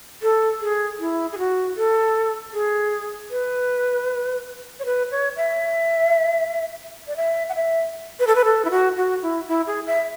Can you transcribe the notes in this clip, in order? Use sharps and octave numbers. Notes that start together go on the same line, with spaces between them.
A4
G#4
E4
G#4
F#4
A4
G#4
B4
C#5
B4
C#5
E5
D5
E5
F#5
E5
B4
A4
B4
A4
E4
F#4
F#4
E4
E4
G#4
E5